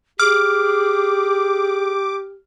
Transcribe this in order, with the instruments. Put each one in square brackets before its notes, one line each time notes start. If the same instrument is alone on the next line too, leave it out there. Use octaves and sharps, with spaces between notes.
[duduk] G4 [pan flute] G#4 [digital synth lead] D6 [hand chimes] F6